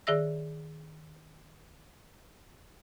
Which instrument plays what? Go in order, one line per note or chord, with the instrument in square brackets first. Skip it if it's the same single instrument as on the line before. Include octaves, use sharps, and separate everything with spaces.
[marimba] D#3 G#4 D5 E5 E6 A#6